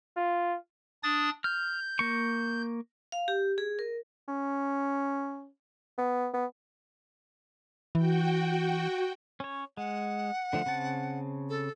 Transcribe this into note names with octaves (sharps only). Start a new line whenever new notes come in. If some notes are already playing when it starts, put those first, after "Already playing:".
F4
D4 D#6 A6
F6 G6
A#3 C#6
F5
G4
G#4
A#4
C#4
B3
B3
E3 F#4 G5
C#4 C#5
G#3 F#5
D3 F3 A3
C#3 C4 A5
A4